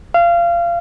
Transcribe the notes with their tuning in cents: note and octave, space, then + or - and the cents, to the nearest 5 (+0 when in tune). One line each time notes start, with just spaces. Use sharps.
F5 -25